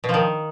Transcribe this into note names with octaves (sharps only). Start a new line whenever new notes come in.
B2
F3
D#3